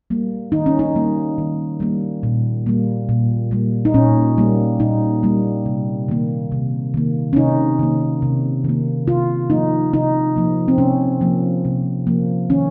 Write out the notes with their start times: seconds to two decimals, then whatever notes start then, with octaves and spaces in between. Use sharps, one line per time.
0.10 G3 A#3
0.52 D#3 D#4
0.66 C#4
0.79 D#4
0.95 G3 A#3
1.38 D#3
1.80 G3 A#3
2.23 A#2
2.66 G3 A#3
3.09 A#2
3.51 G3 A#3
3.85 D#4
3.94 A#2 C#4
4.38 G3 A#3
4.80 A#2 D#4
5.23 G3 A#3
5.66 C3
6.08 D#3 A#3
6.52 C3
6.94 D#3 A#3
7.33 C#4
7.36 C3 D#4
7.79 D#3 A#3
8.22 C3
8.64 D#3 A#3
9.07 C3 F4
9.50 F3 A#3 D#4
9.93 C3 D#4
10.36 F3 A#3
10.68 C4
10.78 C3 C#4
11.21 F3 A#3
11.65 C3
12.07 F3 A#3
12.50 D#3 C#4